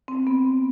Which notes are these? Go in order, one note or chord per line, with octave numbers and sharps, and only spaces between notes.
C4
B3